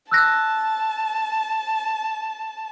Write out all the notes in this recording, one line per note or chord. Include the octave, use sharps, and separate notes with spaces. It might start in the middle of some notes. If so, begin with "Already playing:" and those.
A5 E6 F#6 A#6